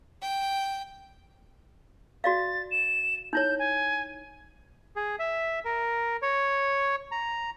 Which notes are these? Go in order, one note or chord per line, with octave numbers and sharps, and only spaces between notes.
G5
F#4 D5 F5 A6
E7
D#4 E4 C#5 G6
G#5
G#4
E5
A#4
C#5
A#5